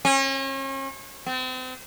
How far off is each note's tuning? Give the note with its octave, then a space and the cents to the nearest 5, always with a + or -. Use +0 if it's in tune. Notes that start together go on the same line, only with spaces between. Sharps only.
C#4 -40
C4 -35